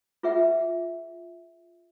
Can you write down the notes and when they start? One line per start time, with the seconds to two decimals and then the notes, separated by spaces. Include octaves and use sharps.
0.23 F4 G#4 B4 E5 F#5